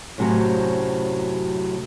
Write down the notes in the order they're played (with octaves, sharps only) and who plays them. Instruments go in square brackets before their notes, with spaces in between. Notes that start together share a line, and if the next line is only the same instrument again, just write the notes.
[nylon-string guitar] F#2 A2 C3 F#3 C4 C#4